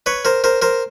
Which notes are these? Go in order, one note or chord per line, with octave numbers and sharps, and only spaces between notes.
B4 C#5
A#4 C5
A#4 C5
A#4 C5